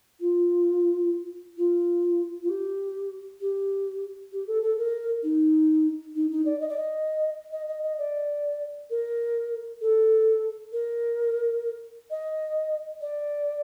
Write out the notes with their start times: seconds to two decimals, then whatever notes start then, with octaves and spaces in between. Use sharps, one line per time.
0.20 F4
1.57 F4
2.42 F4
2.49 G4
3.40 G4
4.32 G4
4.47 A4
4.62 A4
4.77 A#4
5.22 D#4
6.15 D#4
6.30 D#4
6.45 D5
6.60 D#5
6.68 D5
6.77 D#5
7.52 D#5
7.67 D#5
7.82 D#5
7.98 D5
8.90 A#4
9.81 A4
10.72 A#4
12.10 D#5
13.01 D5